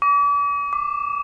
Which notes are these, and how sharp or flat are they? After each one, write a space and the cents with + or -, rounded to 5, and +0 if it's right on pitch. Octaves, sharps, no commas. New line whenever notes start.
D6 -40
D6 +5